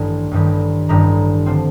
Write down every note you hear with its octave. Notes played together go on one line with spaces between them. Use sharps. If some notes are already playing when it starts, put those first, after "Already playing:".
Already playing: A1 G2 D#3 G3
A1 G2 D#3 G3
A1 G2 D#3 G3 A#5
D3 F3 C4